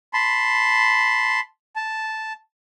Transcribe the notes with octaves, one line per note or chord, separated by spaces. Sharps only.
A5 B5 C6
A5